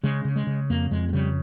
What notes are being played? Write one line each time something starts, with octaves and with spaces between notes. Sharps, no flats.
C#3 G#3
C#3
G#3
C#3
F2 A#3
F2 G#3
G#3
C#3 G3